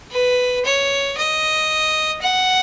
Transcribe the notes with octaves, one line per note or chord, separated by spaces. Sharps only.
B4
C#5
D#5
F#5